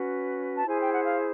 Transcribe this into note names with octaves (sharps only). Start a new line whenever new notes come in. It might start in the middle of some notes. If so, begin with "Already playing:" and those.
Already playing: C#4 F#4 B4
A5
E4 G#4 C5 G#5
G5
F#5
F5